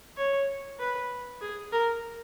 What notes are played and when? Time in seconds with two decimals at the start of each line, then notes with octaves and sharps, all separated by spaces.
0.17 C#5
0.79 B4
1.41 G#4
1.72 A#4